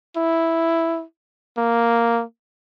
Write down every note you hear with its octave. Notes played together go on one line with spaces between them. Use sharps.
E4
A#3